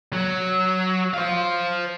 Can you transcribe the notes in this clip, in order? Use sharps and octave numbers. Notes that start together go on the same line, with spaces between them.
F#3
C5 F5